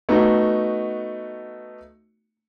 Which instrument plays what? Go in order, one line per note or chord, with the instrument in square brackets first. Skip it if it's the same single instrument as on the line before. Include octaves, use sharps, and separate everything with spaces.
[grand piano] A3 B3 D#4 F#4